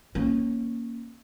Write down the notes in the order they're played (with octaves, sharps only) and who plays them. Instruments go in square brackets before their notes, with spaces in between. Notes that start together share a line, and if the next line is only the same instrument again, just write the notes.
[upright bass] A#3 C#4